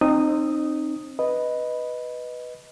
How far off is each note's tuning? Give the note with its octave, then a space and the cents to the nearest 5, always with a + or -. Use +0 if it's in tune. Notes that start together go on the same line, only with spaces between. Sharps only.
C4 +25 D#4 -20 D#6 +0
B4 +0 D#5 +0